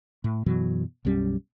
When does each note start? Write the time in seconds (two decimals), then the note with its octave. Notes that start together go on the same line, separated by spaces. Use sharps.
0.24 A2
0.46 F#2 B2 E3 F#3
1.05 B1 F#2 G3 C#4